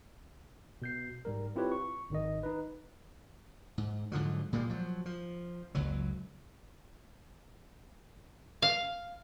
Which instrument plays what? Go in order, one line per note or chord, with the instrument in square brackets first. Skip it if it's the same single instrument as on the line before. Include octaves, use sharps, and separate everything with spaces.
[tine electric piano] B2 G6 C7
G#2 G3 A#4
C4 E4 F4 G4 B4 C#5
C#6
G#1 D#3 D#5
D#4 B4
[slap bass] G#2
G#2 D3 F3 F#3
A#2 G3 G#3 A#3
F3 F#3
F3
F#1 C#2 F#3
[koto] F5